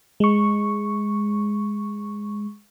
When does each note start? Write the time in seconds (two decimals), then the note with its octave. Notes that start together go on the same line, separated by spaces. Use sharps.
0.20 G#3 C#6